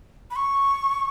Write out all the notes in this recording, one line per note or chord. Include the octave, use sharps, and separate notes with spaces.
B5
C#6